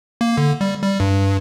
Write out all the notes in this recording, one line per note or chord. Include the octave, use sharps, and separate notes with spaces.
A#3
D3
G3
G3
G2